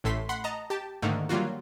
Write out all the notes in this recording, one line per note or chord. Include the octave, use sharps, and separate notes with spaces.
A1 A2 A3 C6 B6
F#5 B5 C6
D#5 A5 A#5
G4 A5
G#2 D3 D#3 A3 A#3
F#3 G3 A#3 F4 F#4